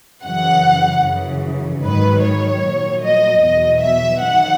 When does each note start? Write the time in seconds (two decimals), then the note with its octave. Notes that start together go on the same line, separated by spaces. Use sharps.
0.24 F#2 C#3 E3 F#5
1.04 F#2 C#3 E3
1.83 G#2 D#3 F#3 B4
2.23 C#5
2.62 A#2 F#3
3.02 D#5
3.42 E2 B2 F#3 D#5
3.82 E5
4.21 F#2 D#3 F#3 F#5